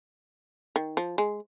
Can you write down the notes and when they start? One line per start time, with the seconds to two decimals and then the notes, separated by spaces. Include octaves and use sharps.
0.76 D#3
0.97 F3
1.18 G#3